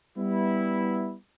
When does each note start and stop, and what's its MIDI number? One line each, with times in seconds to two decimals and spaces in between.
0.17 1.14 55
0.17 1.14 59
0.17 1.14 64